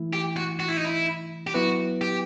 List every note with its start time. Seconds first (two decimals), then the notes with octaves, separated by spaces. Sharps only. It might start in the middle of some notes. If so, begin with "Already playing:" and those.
Already playing: E3 A3 E4
0.13 G4
0.37 F#4
0.60 F#4
0.68 E4
0.77 D#4
0.85 E4
1.47 G4
1.54 F#3 B3 E4 F#4 B4
2.01 G4